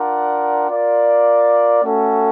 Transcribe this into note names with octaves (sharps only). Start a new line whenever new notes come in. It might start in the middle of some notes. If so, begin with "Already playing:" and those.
Already playing: D4 F4 A#4 D5 F#5
F4 A#4 D5
A3 C#4 F#4 A4